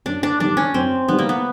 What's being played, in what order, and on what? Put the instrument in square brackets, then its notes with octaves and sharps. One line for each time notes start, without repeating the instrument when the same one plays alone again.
[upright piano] F#2 [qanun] D4
[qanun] D4
[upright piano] D#3 G3 [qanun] D4
[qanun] C#4
[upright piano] F#2 [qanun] C4
[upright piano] D#3 G3 [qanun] B3
[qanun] A#3
B3